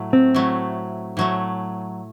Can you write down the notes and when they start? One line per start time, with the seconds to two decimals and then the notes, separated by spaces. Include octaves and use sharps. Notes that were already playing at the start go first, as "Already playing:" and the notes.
Already playing: A2 F#3 A3
0.13 C4
0.35 A2 F#3 A3
1.17 A2 F#3 A3